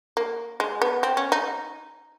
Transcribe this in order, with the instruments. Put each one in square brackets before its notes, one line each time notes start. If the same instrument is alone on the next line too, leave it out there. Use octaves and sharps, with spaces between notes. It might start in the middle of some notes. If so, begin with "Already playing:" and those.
[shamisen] A#3
G#3
B3
C4
C#4
D#4